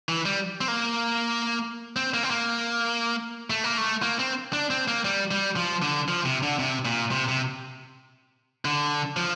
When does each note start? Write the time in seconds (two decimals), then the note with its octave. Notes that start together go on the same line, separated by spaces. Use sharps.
0.09 E3
0.25 G3
0.61 C4
0.68 A#3
1.96 C4
2.14 A#3
2.23 C4
2.31 A#3
3.50 A3
3.64 A#3
3.78 A3
4.03 A#3
4.19 C4
4.53 D4
4.70 C4
4.88 A#3
5.05 G3
5.31 G3
5.56 F3
5.82 D3
6.08 F3
6.25 C3
6.42 D3
6.59 C3
6.85 A#2
7.11 C3
7.28 C3
8.65 D3
9.17 F3